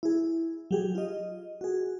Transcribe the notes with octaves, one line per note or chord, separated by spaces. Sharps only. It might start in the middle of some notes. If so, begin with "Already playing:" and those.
E4 G#4
F#3 G4 G#4
F4 D#5
F#4 G#4